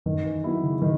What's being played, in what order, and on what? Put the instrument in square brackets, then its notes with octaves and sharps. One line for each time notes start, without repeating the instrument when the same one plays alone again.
[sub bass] F#2 [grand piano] D#3
[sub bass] E3
[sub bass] D#3 [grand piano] F#3 B3 E4
[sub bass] C#3
[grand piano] D#3